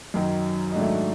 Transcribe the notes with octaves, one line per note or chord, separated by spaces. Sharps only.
F#2 D#3 F#3
D#4
G#2 D#3 F#3 A3 D4